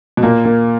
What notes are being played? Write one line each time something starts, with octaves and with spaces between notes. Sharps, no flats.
B2
A#2 A#3
A#3